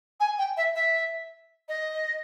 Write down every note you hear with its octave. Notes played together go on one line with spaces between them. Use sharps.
G#5
G5
E5
E5
D#5